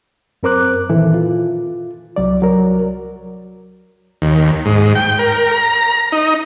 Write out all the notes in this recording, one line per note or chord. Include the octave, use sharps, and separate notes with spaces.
F#2 C4 A#4 C5 D6 F#6
A#2 D#3 E3 E4 A4
F4
C2 F#3 D5
F#3 A#4
D#2
G#2
G5
A#4
A#5
D#4